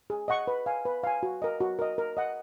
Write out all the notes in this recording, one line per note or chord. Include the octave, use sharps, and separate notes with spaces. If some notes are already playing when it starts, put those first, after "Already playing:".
G#4
D#5 F#5 C#6
B4
F5 G#5
B4
F5 G#5
F#4
A#4 D#5
F#4
A#4 D#5
A#4
D#5 F#5